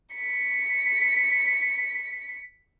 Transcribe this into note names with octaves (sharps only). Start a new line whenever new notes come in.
B6 C#7